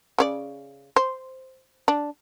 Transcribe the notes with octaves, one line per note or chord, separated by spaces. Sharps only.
C#3 C4 D5
C5
D4